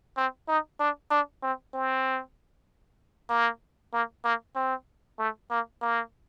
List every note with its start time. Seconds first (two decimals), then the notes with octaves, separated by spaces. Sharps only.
0.17 C4
0.48 D#4
0.80 D4
1.11 D4
1.43 C4
1.74 C4
3.30 A#3
3.93 A#3
4.24 A#3
4.56 C4
5.19 A3
5.50 A#3
5.82 A#3